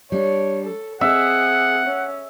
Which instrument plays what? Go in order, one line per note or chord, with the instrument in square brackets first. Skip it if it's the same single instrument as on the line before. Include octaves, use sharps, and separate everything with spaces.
[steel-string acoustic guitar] G3 D4 [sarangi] C#5
[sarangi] A4
[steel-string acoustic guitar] C4 [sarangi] G#4 [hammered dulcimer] E5 [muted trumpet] F#5
[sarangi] C#4